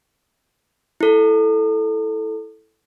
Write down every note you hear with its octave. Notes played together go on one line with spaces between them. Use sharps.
E4 A4